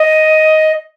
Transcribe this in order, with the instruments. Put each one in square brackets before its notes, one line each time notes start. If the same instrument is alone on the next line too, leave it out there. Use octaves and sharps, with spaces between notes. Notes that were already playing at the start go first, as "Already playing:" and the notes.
Already playing: [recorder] D#5